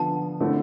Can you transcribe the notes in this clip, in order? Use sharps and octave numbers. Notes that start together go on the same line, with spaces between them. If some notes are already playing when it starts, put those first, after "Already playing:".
Already playing: D3 F3 B3 A5
D3 A3 C4 E4